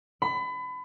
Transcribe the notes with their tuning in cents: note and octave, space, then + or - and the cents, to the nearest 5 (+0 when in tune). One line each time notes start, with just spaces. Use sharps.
B5 +30